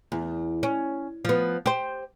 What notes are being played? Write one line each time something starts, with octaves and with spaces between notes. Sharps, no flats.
E2
C#4
F3 B3
G4 C5